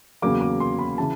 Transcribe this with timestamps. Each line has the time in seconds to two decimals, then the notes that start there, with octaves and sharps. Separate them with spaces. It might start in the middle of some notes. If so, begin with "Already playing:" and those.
0.22 E2 C#3 F#3 A#3 D6
0.41 D6
0.60 C6
0.79 B5
0.98 C#3 E3 A5